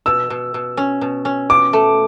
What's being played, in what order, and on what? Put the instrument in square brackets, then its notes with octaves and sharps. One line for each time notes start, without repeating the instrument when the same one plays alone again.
[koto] B2 [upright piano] E6
[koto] B2
B2
C#4
B2
C#4
[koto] B2 [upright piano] D6
[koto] A3